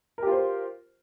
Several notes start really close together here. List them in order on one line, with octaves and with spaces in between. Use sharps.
A#4 G4 F4 C5